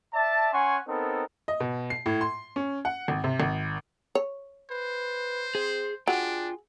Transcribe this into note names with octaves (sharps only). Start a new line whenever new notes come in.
D5 E5 A5
C#4 F#5 G#5 C6 C#6
B3 C4 D#4 A4 A#4
D#5
B2
C7
A2
C6
C#4
F#5
G#1
C3
G#1
C#5
B4 C5
C4 G#4
D4 F4 F#4 G#4 G5